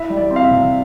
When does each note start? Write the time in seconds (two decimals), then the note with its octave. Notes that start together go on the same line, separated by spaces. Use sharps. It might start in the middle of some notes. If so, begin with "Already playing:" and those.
Already playing: E4 E5
0.10 G3
0.17 D5
0.31 C4
0.36 F5
0.44 E5
0.51 C3